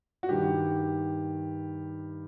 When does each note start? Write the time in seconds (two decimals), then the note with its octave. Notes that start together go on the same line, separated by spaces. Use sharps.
0.23 F#4
0.29 G2 D#3 G4